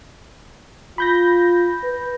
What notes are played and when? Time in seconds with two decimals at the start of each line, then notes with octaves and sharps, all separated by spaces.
0.98 F4 B5 G6 A#6
1.83 B4